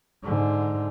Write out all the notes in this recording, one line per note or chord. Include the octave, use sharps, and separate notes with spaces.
G#2 D3